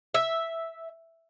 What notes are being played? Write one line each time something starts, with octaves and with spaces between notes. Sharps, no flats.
E5